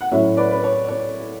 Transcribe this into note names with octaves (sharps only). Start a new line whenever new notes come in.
F#5
A2 F#3 C#4 E4 C#5 E5
B4 D5
B4
C#5
C#5